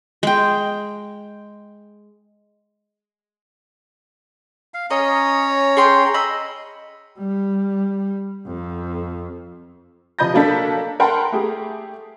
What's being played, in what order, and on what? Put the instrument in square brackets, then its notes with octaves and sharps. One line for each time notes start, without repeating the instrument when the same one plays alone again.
[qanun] G#3 G5
[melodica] F5
[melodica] C#4 C#5 A#5 [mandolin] D#5
[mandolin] G#4 G5 C6
D#5 B5 E6
[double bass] G3
F2
[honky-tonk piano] C3 F3 D#5 B5 G6 A#6
F#3 A#3 D4 A4 B6
A#4 F#5 G5 A5 B5 C6
A3 G4 G#4